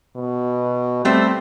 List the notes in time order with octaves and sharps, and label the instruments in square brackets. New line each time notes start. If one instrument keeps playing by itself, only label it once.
[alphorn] B2
[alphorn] G3 [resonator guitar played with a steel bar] A3 C4